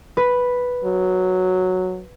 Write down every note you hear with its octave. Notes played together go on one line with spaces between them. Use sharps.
B4
F#3